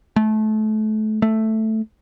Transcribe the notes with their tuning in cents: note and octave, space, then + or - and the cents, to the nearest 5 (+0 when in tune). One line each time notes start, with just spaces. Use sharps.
A3 -30
A3 +0